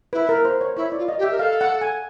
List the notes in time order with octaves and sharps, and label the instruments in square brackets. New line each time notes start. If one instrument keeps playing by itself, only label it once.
[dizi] E4 [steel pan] B4
[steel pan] A#4
C5
C#5
[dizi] E4 [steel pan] C#5
[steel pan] D5
[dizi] F4
[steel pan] D#5
[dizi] G4
[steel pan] E5
[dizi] A#4
[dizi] A4 [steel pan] F5
[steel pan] F#5
G#5